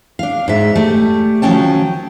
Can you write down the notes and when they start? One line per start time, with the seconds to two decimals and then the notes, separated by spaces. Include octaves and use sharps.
0.19 D4 F5
0.48 G#2 E5
0.75 G3 A3
1.42 D#3 F3 F#3 C#4 G5 A5